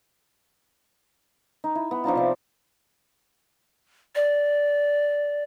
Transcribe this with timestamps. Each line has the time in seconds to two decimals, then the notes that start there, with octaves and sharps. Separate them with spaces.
1.64 D#4
1.75 E4
1.91 B3
2.04 F3 D4 D#4 F4
2.15 C3 D4
4.15 D5